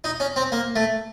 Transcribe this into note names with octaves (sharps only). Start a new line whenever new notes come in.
D#4
C#4
C4
A#3
A3